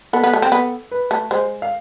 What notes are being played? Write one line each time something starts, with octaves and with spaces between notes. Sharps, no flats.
B3 A4
B3
A3
C4
B3
B4
A3
G#3 C5
F5